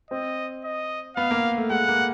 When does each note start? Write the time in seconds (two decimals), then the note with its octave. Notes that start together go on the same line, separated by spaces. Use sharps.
0.11 C4 D#5
0.64 D#5
1.16 B3 F5
1.31 A#3
1.57 A3
1.70 G#3 F#5
1.88 A#3